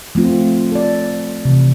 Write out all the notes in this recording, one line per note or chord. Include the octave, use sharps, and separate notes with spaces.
F3 A3 C4 F4
A4 D5
C3 E3